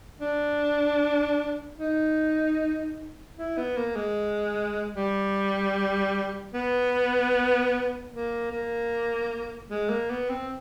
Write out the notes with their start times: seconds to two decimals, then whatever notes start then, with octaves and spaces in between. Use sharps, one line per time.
0.21 D4
1.79 D#4
3.37 E4
3.57 B3
3.77 A#3
3.96 G#3
4.96 G3
6.54 B3
8.12 A#3
8.52 A#3
9.70 G#3
9.89 A#3
10.10 B3
10.29 C4